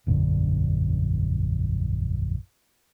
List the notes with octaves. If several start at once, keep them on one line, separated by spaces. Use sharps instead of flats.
E1 A#1 F#2 D3